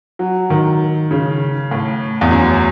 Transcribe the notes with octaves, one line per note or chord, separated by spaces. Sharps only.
F#3
D#3
C#3
A2
E2
F#2